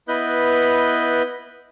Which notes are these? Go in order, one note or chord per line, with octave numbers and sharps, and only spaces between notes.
B3 E4 B4 D#5 F#6 G6